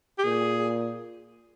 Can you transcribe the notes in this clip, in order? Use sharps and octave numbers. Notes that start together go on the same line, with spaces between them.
G4
A#2 G#4